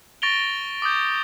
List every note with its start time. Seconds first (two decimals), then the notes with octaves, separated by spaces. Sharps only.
0.22 C#6 A6 A#6 D7 F7 G7
0.82 D6 D#6 G6